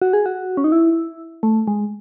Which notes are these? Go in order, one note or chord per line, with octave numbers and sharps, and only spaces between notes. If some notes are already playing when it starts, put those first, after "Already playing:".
F#4
G#4
F#4
C#4
D#4
E4
A3
G#3